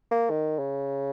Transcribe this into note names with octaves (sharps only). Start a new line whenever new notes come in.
A#3
D#3
C#3